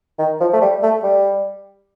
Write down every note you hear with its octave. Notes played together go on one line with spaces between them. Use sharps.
D#3
F3
A3
G3
A3
G3